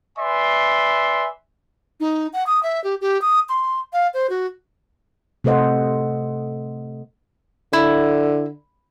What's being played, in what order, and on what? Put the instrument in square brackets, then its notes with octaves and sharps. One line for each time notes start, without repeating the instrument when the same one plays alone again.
[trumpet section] B4 D5 E5 G#5 C6
[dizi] D#4
F#5
D#6
E5
G4
G4
D#6
C6
F5
C5
F#4
[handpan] C3 A3 A4 C5 D#5 F#5
[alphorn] D3 [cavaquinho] E4